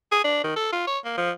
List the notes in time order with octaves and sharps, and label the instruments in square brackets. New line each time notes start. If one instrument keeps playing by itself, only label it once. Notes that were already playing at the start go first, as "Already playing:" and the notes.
[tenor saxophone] G#4
D4
D#3
A4
F4
C#5
A#3
F3